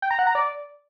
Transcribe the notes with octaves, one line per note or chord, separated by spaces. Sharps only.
G5
A#5
F#5
A#5
D5